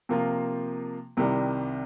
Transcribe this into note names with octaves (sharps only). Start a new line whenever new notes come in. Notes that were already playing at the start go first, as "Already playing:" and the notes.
C3 F3 A#3 F4
C2 C3 D#3 G3